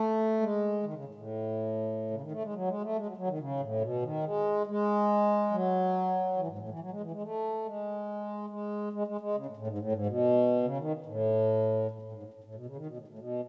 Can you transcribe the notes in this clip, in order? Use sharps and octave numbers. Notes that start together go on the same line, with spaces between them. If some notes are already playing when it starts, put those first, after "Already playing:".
Already playing: A3
G#3
D#3
C#3
A2
A2
C#3
D#3
A3
G#3
F#3
G#3
A3
G#3
F#3
F#3
D#3
C#3
A2
B2
D#3
G#3
G#3
F#3
E3
G#2
A2
E3
F#3
G#3
E3
G#3
A3
G#3
G#3
G#3
G#3
G#3
C#3
A2
A2
G#2
A2
G#2
B2
C#3
D#3
A2
A2
A2
G#2
A2
A2
A2
B2
C#3
D#3
B2
A2
A2
B2